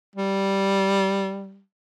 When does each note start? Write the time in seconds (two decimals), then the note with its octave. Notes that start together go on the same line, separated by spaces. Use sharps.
0.16 G3